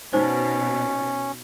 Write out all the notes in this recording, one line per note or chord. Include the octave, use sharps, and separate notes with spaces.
B2 C#4 D#4 C5 D5